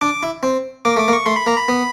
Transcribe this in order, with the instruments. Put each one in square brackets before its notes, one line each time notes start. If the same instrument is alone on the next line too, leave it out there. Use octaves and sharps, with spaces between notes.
[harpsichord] D4 [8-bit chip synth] D6
[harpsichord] E4
C4
[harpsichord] A#3 [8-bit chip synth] D6
[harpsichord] A3 [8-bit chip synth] D6
[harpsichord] A#3
[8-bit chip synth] C#6
[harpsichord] A3 [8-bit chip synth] C6
[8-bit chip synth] B5
[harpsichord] A#3 [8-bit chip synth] A#5
[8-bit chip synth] B5
[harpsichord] B3